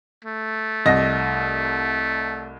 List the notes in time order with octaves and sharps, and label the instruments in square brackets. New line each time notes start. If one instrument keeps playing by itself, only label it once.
[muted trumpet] A3
[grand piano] C2 D#5 A#6